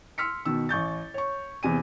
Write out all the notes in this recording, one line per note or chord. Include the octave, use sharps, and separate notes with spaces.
C6 E6 F6 B6 C#7
B2 D#3 E6
A1 C#6 G6 A6
C#5 C#6
E2 C3 G#5 D#7